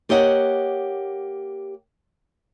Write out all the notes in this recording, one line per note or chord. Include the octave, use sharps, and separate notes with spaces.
A#3 G4 C#5 D#5 F5 F#5